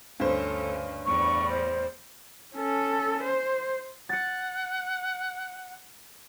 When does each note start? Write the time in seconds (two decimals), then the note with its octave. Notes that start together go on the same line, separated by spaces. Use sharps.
0.20 D2 G2 C#4 A4 C5
1.05 E2 A2 G3 C#6
1.49 C5
2.54 C#4 A4
3.23 C5
4.09 F#5 A6 C#7